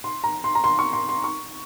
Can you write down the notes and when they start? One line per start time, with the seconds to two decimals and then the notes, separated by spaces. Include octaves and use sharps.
0.04 C6
0.24 A#5
0.44 C6
0.55 A#5
0.64 C6
0.79 C#6
0.93 C6
1.09 C6
1.24 C#6